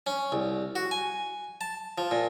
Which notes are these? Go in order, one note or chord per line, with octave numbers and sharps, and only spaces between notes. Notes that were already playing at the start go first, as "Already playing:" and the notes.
C#4
C2
F#4
G#5
A5
F3
A#2